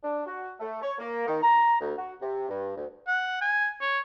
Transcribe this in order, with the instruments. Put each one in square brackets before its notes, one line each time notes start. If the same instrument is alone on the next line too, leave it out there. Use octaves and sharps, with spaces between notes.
[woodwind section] D4
F#4
A3
C#5
A#3
D#3
A#5
D2
F#4
C3
G2
D2
[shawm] F#5
G#5
C#5